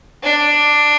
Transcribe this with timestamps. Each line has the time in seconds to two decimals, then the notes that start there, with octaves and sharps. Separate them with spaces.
0.23 D4